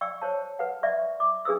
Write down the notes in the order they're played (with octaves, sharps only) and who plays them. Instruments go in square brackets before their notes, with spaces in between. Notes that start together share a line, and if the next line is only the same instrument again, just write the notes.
[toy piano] D5 G5 C#6 E6
C5 C#5 A5
B4 F#5
D5 E5 C#6
D6
D4 G#4 B4 D#6 E6